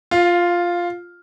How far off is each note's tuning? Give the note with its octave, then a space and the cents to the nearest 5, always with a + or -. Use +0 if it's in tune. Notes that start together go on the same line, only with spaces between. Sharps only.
F4 +0 F5 +30